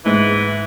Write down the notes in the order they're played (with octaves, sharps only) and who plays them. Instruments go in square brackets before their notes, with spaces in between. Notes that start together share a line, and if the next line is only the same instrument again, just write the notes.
[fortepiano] G#2 [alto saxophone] E3